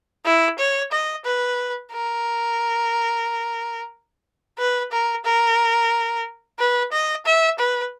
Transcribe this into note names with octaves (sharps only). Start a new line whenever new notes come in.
E4
C#5
D#5
B4
A#4
B4
A#4
A#4
B4
D#5
E5
B4